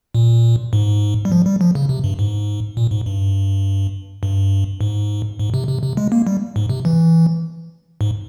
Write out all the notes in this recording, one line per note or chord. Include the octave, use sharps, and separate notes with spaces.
A#2
G#2
G3
F3
G3
F3
C#3
C3
G2
G#2
A#2
G#2
G2
G2
G#2
G#2
C3
C3
C3
G#3
A#3
G3
G#2
C3
E3
G#2